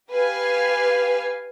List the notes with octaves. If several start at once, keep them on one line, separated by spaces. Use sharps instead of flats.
G4 B4 F5 G#5